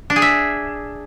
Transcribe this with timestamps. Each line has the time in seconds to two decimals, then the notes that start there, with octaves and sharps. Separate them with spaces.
0.10 D4
0.16 G#4
0.22 E5